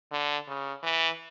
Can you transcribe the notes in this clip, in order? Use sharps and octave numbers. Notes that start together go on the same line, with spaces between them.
D3
C#3
E3